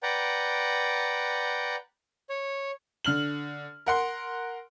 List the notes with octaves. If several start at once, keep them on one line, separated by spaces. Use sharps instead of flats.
B4 D5 F#5 G5 A#5
C#5
D3 F6 F#7
A#4 F#5 C6